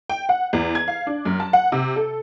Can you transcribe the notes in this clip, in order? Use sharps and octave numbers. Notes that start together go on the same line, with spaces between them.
G5
F#5
E2
G#6
F5
D4
F#2
A5
F#5
C3
A4